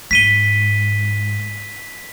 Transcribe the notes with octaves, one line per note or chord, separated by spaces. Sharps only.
G#2 B6 D#7 G7